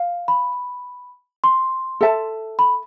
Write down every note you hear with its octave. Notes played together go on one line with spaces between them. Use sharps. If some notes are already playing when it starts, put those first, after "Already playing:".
Already playing: F5
B5
C6
A4 E5 A5
B5